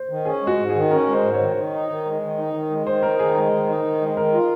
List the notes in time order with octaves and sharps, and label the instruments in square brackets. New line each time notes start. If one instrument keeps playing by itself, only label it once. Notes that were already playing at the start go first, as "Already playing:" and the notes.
Already playing: [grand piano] C5
[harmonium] D#3
[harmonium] C#4 [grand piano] G#4
[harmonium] G#3
[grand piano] F#4
[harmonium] G#2
[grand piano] G#4
[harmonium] D#3
[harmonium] C#4 [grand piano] A#4
[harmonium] G#3
[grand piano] C5
[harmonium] G#2
[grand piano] C#5
[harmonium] D#3
D#3
D#4
D#3
G#3
D#3
D#4
D#3
G#3
[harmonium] D#3 [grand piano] C5
[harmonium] D#4 [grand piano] A#4
[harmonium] D#3 [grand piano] G#4
[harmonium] G#3 [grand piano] A#4
[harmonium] D#3
D#4
D#3
G#3
[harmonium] D#3 [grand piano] A#4
[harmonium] F4